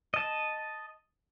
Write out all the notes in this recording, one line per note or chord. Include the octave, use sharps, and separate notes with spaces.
D#5 A5